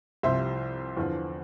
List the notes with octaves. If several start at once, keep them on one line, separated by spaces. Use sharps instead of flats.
C2 C3 F3 C5 E5
E2 D3 F3